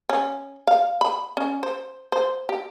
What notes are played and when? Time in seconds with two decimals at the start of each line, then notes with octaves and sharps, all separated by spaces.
0.09 C#4
0.67 F5
1.01 B5
1.37 C#4
1.63 C5
2.12 C5
2.49 G4